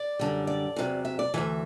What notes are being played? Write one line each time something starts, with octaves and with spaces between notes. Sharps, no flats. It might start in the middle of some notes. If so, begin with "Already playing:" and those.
Already playing: D5
F#2 D3 G3
D5
E2 C3 F#3
E5
D5
D2 C3 E3 E5